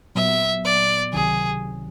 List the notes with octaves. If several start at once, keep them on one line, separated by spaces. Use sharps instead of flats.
A#2 F#3 B3 E5
D5
C#2 C3 D#3 F#3 G#4